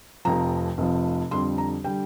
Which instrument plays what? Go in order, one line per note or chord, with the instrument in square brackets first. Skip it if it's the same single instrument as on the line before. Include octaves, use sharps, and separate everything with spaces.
[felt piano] F1 F2 F3 A#5
F1 F2 F3
F2 D3 G3 C6
A#5
D3 G3 G5